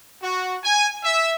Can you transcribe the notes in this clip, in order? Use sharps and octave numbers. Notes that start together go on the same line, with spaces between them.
F#4
G#5
E5